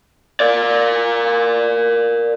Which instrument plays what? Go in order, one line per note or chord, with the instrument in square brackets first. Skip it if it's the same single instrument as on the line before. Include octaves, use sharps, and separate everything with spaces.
[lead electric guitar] A#4 D5